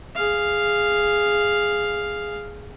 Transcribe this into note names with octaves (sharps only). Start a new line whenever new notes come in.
G#4 F5